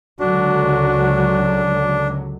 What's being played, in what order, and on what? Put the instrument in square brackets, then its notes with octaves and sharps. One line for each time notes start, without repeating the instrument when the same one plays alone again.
[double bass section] C#2 D3 F#3 [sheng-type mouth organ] D4 [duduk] F#4